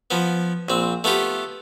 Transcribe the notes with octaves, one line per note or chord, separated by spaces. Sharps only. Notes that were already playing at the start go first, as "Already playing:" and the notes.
F3 B3
A#1 C4
A3 B3 F4 G4